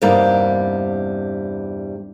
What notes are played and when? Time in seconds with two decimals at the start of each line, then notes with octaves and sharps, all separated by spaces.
0.02 E2 G2 C3 G3 A#3 D#4